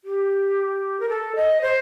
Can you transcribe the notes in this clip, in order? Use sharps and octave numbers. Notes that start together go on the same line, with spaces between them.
G4
A#4
A4
D#5
C5